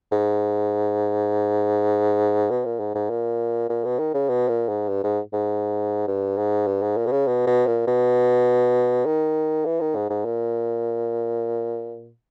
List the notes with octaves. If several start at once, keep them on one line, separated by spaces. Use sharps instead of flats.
G#2
B2
A#2
G#2
G#2
A#2
A#2
B2
D#3
C#3
B2
A#2
G#2
G2
G#2
G#2
G2
G#2
G2
G#2
A#2
B2
C#3
B2
B2
A#2
B2
D#3
E3
D#3
G#2
G#2
A#2